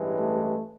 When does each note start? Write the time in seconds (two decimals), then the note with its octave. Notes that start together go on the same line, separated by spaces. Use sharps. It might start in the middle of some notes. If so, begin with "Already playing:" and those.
Already playing: A1 G2 E3 G#3
0.18 A3